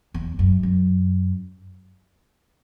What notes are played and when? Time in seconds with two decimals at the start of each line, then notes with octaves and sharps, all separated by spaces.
0.14 E2
0.39 F#2
0.63 F#2